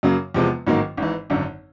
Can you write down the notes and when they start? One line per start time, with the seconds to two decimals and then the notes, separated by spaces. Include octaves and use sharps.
0.03 F#2 C#3 F#3 A#3
0.34 E2 C3 F3 G#3 B3
0.67 A1 G#2 D#3 F#3 A#3
0.97 G#1 G#2 E3
1.30 G#1 F#2 D3